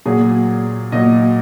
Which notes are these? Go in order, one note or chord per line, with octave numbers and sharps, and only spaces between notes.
A#2 F#3 G#4
A#2 F#3 D#5